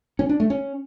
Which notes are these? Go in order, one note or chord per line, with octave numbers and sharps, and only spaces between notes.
C#4
D4
A3
C#4